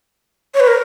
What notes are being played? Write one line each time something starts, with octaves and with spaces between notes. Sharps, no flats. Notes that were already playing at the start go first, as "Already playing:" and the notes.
C#5
B4
A#4